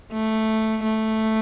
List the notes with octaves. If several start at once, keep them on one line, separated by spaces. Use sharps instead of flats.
A3
A3